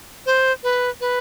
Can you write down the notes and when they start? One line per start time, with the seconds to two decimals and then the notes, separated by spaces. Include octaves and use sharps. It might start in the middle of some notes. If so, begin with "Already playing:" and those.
0.26 C5
0.63 B4
1.01 B4